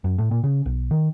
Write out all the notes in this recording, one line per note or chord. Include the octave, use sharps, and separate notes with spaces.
F#2
A2
A#2
C#3
B1
D#3